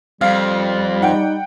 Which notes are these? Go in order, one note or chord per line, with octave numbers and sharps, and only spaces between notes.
F2 G3 F5
D#4 F#5 G5